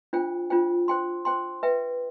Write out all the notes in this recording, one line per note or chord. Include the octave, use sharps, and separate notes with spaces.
D4 F4 C5 G5
D4 F4 C5 G5
C5 G5 C6
C5 G5 C6
B4 E5 G5